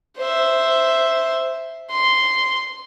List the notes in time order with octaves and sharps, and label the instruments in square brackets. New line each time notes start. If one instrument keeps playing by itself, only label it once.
[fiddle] C5 E5
C6